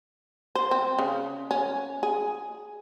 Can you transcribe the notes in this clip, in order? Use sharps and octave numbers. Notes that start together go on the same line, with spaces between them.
C5
C4
C#3
C#4
G#4